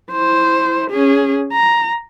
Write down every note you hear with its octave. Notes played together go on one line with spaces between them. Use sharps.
E4 C5
C#4 G#4
A#5